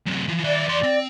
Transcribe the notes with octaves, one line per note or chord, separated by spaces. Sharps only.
F#2 C3
E3 F3
D#3 D5 E5
E2 C6
C4